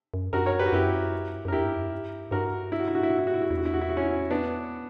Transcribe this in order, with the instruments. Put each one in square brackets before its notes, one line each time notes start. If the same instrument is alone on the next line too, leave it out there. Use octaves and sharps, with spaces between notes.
[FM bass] F#2
[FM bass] F#2 [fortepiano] F#4 A#4
[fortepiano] A#4 C#5
G4 B4
F#4
[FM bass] F#2 [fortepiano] E4 G4
[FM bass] G2
F#2
[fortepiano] A#4
[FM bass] E2 [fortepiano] E4 G4
[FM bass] G2
F#2
G2
[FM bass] G2 [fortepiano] F#4 A#4
[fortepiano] E4
F#4
E4
F#4
E4
F#4
E4
F#4
E4
F#4
[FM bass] E2 [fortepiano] E4
[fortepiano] F#4
E4
F#4
E4
F#4
C#4 E4
B3 D4